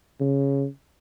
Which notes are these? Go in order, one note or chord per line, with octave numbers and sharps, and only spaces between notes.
C#3